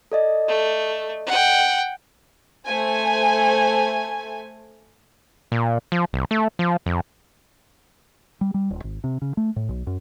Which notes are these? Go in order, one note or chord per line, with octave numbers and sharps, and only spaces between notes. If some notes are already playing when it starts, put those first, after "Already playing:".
A4 D5 D#5
A3
F#5 G5
A3 C5 G#5
A#2
F3
C2
A3
F3
F2
G3
G3
D#1
G#1
C3
C#3
A3
A2
B1
F#2